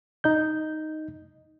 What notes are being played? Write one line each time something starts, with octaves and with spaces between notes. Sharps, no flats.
D#4 D#5 G6